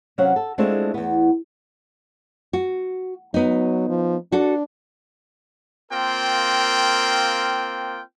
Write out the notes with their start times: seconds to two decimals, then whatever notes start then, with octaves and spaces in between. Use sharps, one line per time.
0.18 C3 F#3 C#4 C#5 F5 F#5
0.36 A4
0.58 G#3 A3 C4 D4 E4 F4
0.94 E2 B3
2.53 F#4
3.34 F#3 B3 D#4
3.89 F3
4.32 D4 F#4 A4
5.91 A#3 C4 F4 A#4 G5